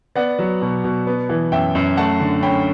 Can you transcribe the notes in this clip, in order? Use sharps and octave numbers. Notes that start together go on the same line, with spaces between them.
B3 D5 F#5
F#3
B2
B2
B3
E3
F#2 E5 G5
F#2
A3 F#5 A5
D3
C#4 G5 B5